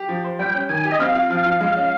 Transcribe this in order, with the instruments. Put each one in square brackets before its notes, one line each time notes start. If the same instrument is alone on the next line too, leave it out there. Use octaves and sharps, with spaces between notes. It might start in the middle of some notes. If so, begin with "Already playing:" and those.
Already playing: [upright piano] G4
F3
C5
[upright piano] G3 [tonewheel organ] G5
[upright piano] C#4
[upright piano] D#3 [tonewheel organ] G#5
[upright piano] G4
[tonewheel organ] D#5
[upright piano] C4 [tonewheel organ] F5
[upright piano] F4
[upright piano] F3 [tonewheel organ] F5
[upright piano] F3
G#3
C#4